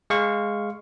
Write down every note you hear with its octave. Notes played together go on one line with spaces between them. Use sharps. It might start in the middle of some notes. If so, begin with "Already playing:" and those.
G#3 F5 C#6